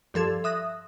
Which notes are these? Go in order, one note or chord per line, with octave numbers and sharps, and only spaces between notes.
G2 F3 A4 G#6
E5 D#6 F#6 A#6